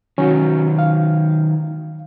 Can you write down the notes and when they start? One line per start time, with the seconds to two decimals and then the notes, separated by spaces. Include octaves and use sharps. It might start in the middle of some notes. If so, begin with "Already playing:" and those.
0.18 D#3 F#3 C#4 F#4
0.79 F5